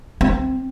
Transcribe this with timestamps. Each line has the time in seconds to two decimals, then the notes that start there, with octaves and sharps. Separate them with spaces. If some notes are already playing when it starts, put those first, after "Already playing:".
0.21 C4